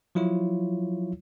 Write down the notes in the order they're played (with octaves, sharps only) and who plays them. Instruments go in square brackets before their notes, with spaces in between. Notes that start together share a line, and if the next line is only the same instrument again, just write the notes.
[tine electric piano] F3 F#3 E4 F4 C#5